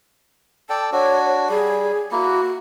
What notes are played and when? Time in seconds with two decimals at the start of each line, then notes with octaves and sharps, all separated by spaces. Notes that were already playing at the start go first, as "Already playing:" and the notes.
0.70 A4 D5 G5 A5
0.92 D4 F#4 C#5
1.49 G3 G#4
2.12 A#3 E4 F#4